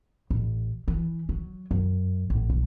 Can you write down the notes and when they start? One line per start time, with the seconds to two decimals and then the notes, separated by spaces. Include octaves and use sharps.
0.30 A1
0.88 E3
1.29 F#3
1.71 F#2
2.30 A1
2.50 B1